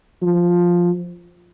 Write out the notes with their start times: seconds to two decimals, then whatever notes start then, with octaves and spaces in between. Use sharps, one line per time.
0.22 F3